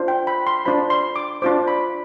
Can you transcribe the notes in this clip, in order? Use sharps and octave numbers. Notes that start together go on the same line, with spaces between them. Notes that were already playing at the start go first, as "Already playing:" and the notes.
Already playing: D4 F4 C5
G5
B5
C6
D4 F4 C5 B5
C6
D6
D4 F4 C5 D6
B5